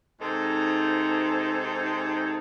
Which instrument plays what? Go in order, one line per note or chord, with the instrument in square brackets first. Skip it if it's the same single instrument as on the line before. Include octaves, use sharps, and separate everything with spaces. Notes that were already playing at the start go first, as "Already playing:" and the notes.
[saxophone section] G#2 C3 D#4 A4 C5